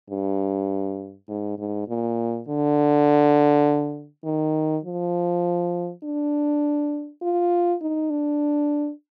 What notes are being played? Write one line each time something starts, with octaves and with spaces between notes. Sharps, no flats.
G2
G#2
G#2
A#2
D3
D#3
F3
D4
F4
D#4
D4